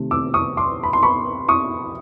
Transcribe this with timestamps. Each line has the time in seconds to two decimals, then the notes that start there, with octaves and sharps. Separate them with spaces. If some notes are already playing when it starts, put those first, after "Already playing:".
Already playing: C3 D#3 A3
0.11 D6 E6
0.34 C#6 D#6
0.57 C6 D6
0.83 B5
0.93 C6
1.03 B5 C#6
1.49 C#6 D#6